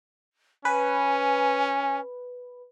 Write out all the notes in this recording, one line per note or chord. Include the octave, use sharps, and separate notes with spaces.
C#4 B4 G#5